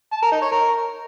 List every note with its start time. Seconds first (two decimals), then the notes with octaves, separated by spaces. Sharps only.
0.13 A5
0.22 A#4
0.32 D#4
0.42 C#5
0.52 A#4